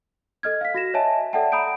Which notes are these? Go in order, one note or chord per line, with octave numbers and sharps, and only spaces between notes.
A4 D#5 F6 G#6
F5 B6
F#4 A#6 E7
C#5 D#5 E5 G#5 A5
A4 D5 E5 F#5 G5 A5
F#5 A#5 B5 D#6 G6 D7